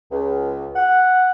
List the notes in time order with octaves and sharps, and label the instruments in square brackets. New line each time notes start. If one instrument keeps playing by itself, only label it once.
[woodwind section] C#2
F#5